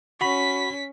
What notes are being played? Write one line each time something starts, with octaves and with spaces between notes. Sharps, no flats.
C#4 F#4 B5 B6